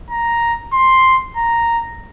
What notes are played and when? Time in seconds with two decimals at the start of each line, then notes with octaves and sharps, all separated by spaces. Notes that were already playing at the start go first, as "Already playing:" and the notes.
0.10 A#5
0.73 C6
1.37 A#5